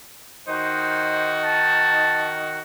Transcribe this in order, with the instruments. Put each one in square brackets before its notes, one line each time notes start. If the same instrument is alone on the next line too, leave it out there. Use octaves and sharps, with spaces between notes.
[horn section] D#3 D#4 F#4 [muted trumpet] C5
[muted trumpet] A5